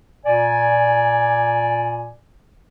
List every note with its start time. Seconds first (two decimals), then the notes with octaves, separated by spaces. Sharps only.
0.26 A#2 D5 G#5